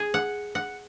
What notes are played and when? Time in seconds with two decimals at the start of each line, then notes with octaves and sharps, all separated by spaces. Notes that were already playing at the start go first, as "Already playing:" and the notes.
Already playing: G#4
0.14 F#5
0.55 F#5